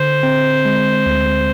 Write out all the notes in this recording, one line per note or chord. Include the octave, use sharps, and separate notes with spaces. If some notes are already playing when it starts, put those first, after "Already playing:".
Already playing: D3 C5
C4
G#3
D2